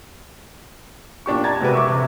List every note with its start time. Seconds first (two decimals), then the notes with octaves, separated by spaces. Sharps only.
1.26 A#2 D4 G4 C#6
1.44 A5 A#5 G#6 A6
1.60 C3 G#3 F#4 G4 A#4 B4
1.73 E5 C#6 D6
1.87 G#1 C3